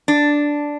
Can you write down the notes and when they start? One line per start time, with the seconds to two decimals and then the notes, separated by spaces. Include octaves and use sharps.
0.08 D4